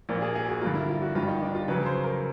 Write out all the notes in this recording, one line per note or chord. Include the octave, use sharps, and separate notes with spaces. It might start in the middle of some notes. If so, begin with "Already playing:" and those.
A#1 A#2 F3 A#3
G#4
G#4
F#4
G2 D3 F3 A#3 F4
E4
F4
F#4
G1 G2 D#3 G3 F4
D#4
D4
F4
F2 C#3 F#3 B4
C5
A#4